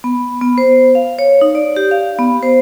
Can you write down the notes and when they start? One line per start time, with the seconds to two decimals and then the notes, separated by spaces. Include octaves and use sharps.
0.04 B3
0.41 B3
0.58 C5
0.95 F5
1.19 C#5
1.41 D#4
1.55 D5
1.76 G4
1.91 F5
2.19 B3
2.43 C5